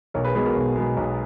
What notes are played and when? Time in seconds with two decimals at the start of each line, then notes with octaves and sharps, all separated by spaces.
0.14 B1 A#4 C#5
0.25 G#4 B4
0.35 B2 G#3 B3 G#4 B4
0.45 F#4 A#4
0.56 B1
0.76 B2 G#3 B3
0.97 B1